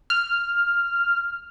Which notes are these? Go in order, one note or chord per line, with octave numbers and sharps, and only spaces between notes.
F6